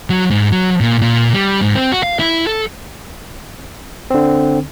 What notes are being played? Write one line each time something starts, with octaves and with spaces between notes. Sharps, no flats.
F#3
G#2
F#3
A#2
A#2
G3
G#2
C4
F#4
F5
E4
A4
D3 C4